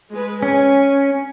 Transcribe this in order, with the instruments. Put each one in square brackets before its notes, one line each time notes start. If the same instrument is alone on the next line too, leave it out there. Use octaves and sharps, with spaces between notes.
[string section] G#3 B4
[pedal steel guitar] C#4 [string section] G#5